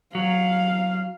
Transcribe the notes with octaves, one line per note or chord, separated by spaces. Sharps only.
F#3 F5